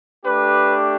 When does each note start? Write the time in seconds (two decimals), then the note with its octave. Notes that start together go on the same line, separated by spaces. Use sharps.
0.24 A3 D4 G4 B4